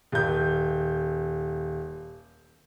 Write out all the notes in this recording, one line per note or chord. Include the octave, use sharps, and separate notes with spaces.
D#1 G6